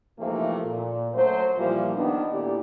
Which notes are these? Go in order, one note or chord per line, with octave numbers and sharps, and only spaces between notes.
G#2 C3 E3 F3 A3 A#3
A#2
F#2 F#3 A3 C5
A#2 E3 F3 G3 A#3
D#3 B3 D4
D2 A#2 E4 G4 D5